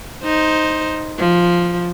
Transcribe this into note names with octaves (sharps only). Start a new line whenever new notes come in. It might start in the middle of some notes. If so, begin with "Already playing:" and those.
D#4 C5
F3